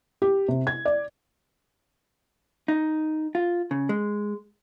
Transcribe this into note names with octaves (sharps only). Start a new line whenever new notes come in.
G4
C3
G#6
D5
D#4
F4
C#3
G#3